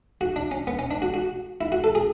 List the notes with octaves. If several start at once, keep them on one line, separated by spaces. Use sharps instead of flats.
F#4
D4
C#4
B3
C#4
D4
F#4
F#4
E4
F#4
A4
G#4